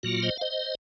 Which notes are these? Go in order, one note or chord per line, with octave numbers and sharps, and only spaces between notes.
A#2 F#3 A#3 F4 F#4
C5 D#5
F5
C5 D#5